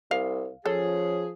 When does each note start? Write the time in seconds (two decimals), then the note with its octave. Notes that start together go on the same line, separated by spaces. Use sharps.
0.11 C2 F5
0.66 F3 C#4 G#4 A4